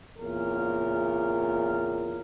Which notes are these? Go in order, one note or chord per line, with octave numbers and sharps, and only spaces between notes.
E2 A#2 C#3 A#4